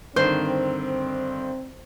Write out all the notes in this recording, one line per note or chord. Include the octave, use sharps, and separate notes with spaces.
G2 D3 D#3 C4 C5